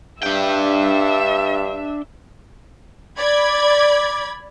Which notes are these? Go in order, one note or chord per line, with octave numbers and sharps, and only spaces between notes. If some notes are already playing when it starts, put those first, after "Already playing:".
G2 D4 E5 G5
D5 B5 G#6